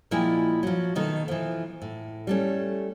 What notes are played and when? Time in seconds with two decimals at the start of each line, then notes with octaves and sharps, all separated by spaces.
0.11 A#2 F3 G#3 E4 G5 G#5
0.63 F3 F#3
0.95 B2 D#3 A3
1.28 E3 F3
1.82 A2
2.27 G3 A3 C#4